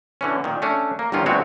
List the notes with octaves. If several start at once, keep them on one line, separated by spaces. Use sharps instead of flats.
D3 E3 C#4
A#2 D#3
A3 C#4 D4
A#3
G1 E2 D#3 C#4 F4
D2 G2 G#3 C4 F#4 C#5